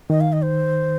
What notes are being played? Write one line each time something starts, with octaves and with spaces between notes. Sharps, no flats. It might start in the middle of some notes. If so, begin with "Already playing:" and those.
D#3 D#5
F5
D#5
C5